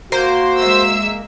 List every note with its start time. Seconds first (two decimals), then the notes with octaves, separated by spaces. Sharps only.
0.12 A#3 F#4 C5
0.59 G#3 E5 E6